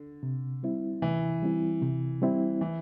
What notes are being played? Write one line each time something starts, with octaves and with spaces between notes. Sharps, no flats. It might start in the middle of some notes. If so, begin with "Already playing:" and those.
Already playing: D3
C3
G3 C4 E4
C3 E3
G3 C4 E4
C3
G3 C4 E4
E3